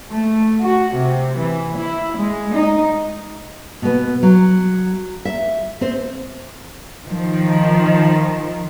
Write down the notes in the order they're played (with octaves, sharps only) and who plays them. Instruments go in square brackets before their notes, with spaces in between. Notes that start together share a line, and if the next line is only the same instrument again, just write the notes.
[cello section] A3
F#4
C3
E3
E4
G#3
D#4
[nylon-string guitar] B2 B3
F#3
E5
C4 C5
[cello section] D#3 F3